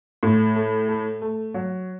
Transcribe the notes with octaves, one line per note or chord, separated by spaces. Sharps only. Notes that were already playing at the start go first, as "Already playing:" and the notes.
A2
A3
A3
A3
F#3